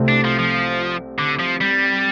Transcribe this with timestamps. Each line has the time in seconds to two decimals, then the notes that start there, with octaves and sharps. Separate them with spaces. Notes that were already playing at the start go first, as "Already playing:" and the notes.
Already playing: C2 C3 A3 C4
0.08 D4
0.25 F3
0.39 F3
1.19 D3
1.39 F3
1.61 G3